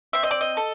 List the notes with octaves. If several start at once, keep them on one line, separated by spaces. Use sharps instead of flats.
C4 E5
D#5
D5
D#5
A4